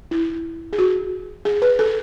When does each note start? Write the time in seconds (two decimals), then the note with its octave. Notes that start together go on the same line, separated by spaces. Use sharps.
0.11 E4
0.73 G#4
0.78 F#4
1.45 G#4
1.62 B4
1.79 A4